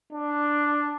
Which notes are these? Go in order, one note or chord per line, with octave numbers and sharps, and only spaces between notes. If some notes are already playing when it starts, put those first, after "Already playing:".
D4